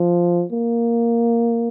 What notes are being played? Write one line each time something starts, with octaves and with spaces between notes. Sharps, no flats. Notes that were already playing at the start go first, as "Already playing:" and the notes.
Already playing: F3
A#3